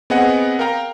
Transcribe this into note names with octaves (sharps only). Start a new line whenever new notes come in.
B3 C4 G#4 D#5 F#5
A#4 F5 G5 A#5